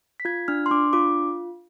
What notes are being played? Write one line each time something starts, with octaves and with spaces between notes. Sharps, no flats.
B6
F4 G#6
D4 F6
C6
D4 D6
F4 D6